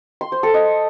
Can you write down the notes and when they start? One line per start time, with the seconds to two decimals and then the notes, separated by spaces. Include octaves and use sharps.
0.21 C6
0.32 C5
0.43 A4
0.54 D#5